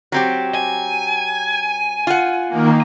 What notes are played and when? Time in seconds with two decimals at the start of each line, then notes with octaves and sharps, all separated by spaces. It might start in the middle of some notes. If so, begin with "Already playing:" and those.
0.12 F#3 C4 G4
0.55 G#5
2.07 F4 F#5
2.49 D#3 A#3